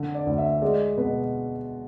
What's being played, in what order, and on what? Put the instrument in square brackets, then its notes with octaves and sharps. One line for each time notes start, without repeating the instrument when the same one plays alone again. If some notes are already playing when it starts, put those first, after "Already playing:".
Already playing: [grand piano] D3
D5
D2
E5
G#3 D5
B2 B4